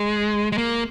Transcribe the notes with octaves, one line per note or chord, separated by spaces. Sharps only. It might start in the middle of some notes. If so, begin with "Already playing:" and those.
Already playing: G#3
G#3
A#3